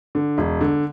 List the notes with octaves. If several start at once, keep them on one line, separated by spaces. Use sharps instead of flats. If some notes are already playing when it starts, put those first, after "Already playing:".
D3
E1
D3